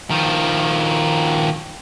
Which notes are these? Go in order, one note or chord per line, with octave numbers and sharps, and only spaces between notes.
D#3 F3